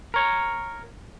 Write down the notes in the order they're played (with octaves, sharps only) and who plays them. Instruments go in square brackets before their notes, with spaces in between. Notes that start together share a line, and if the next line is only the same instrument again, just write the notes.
[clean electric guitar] A#4 C#5